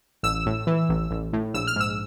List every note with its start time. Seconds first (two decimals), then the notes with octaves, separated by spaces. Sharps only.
0.23 A1 E6
0.46 A2
0.67 E3
0.89 A1
1.10 A1
1.33 A2
1.54 A#1 E6
1.67 F6
1.76 G#2 E6